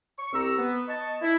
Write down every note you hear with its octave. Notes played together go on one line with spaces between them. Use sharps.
C#6
C2 C4 G4 A#5 E6
B3
D#5 A5 C#6
E4